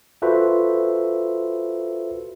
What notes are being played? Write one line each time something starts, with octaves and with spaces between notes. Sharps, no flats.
F4 F#4 A4 B4 C5 E5